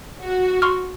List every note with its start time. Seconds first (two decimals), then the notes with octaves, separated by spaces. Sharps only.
0.21 F#4
0.62 C6 C#6 F6